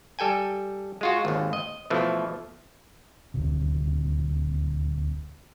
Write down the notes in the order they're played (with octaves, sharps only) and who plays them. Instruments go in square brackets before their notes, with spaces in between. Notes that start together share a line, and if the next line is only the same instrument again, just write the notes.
[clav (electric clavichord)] G3 A4 G5 G#5
G#3 F4 F#4
G#1 D#2
D#5
B2 E3 F3 A3
[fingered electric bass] D#1 D2 C3